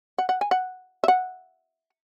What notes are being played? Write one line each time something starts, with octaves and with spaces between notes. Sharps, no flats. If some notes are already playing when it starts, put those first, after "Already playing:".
F#5
F#5
G#5
F#5
E5
F#5